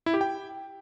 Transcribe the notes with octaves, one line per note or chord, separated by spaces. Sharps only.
E4
G4
G5